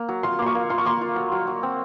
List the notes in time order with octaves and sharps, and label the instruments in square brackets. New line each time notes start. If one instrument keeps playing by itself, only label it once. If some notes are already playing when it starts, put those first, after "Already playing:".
Already playing: [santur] A#3
F#3
[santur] F4 [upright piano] C6
[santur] A#3 [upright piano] C6
[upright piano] C#6
[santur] A#3
[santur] F4 [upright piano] C6
[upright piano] C#6
[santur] A#3 [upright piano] C6
[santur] F4
F#3
F#3
F#3
C4